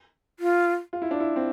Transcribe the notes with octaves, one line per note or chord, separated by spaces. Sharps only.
F4
F4
E4
D4
E4
C4